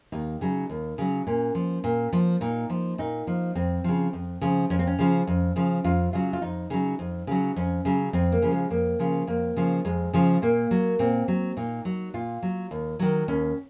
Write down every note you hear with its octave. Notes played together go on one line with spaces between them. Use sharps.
D#2 D#4
C#3 F#3
D#2
C#3 F#3
A#2 C#4
F3
A#2
F3
A#2 D#4
F3
A#2 D#4
F3
F2 C4
C#3 F3
F2
C#3 F3
F2 C#4
C4
C#4
C#3 F3
F2
C#3 F3
F2 F4
C#3 F#3 F4
F4
F2 D#4
C#3 F#3
F2
C#3 F#3
F2 C#4
C#3 F#3
F2 C4
A#3
C#3 F3
G#3
F2 A#3
C#3 F3
F2 A#3
C#3 F3
F2 G#3
C#3 F3
A#2 A#3
F#3
A#2 C4
F#3
A#2 D#4
F#3
A#2 F4
F#3
D#2
D#3 F#3
D#2 C#4